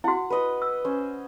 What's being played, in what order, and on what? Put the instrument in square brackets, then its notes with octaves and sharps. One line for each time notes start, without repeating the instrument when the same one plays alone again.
[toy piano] E4 F#4 [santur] F#5
[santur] B4 D#5
[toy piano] E6
[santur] C#4 C5